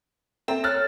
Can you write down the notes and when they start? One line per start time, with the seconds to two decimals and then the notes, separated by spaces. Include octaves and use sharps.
0.48 C4 A4 E5 A#5
0.64 C#5 F6 F#6 A6